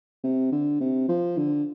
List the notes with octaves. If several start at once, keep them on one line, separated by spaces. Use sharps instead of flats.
C3
D3
C3
F3
D3